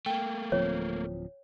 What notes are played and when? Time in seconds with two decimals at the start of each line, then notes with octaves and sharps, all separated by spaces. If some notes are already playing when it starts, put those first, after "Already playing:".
0.06 A3 A#3 G5
0.52 D1 F3 C4 C#5